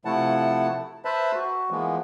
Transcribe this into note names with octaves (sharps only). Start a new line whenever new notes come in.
C3 F3 A3 E4 F#5 A5
B4 C5 E5 A5 B5
F#4
E3 F3 G#3 A#3 B3